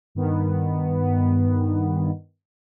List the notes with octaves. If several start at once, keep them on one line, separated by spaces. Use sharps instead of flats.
G2 D#3 B3